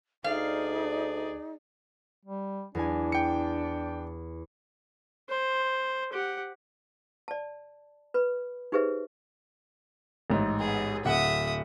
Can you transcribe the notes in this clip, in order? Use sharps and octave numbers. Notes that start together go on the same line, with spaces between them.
D2 D#4 G#4 D5 F5
G3
E2 D4 G#5
G5 C#7
C5
G4 F#5
D5 A5
B4 B5
D#4 G4 G#4 B4 C5 E5
A1 G#2
B3 G#4
D1 E5 F#5 D#6